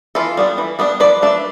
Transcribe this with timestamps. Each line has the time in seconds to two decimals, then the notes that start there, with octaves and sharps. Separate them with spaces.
0.15 E3 F4 A4
0.37 G3 B3 D4
0.58 E3
0.79 G3 B3 D4
1.00 F3 B4 D5
1.22 A3 D4